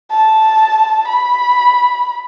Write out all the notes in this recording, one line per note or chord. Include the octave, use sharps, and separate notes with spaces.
A5
B5